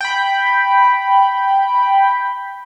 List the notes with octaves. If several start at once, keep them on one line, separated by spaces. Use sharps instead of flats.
G5 B5